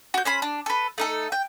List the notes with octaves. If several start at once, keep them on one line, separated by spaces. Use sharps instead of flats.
F#4 G6
C#4 C5 B5
D4
A4 B4
A3 D#4 A4
G5